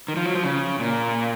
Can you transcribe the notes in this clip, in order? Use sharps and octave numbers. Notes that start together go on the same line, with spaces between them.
D#3
F3
F#3
F3
C#3
A#2